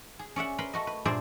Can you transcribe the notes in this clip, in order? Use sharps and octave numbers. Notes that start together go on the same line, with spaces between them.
G#4
C#4 D5 E5 F#5
A#4 B4 B5 C6
A3 F#4 D#5
B4
G2 A#2 G#4 C5 D5 E5